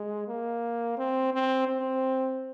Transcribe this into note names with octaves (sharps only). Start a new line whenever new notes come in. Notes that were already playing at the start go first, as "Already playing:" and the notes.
Already playing: G#3
A#3
C4
C4
C4